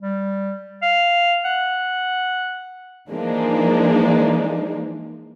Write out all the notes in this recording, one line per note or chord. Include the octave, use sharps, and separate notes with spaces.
G3
F5
F#5
E3 F3 G#3 A#3 D4 D#4